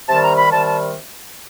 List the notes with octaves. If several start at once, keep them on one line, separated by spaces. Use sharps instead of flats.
C3 D#3 G3 A5
A#5
B5
C3 D#3 G3 A5
A5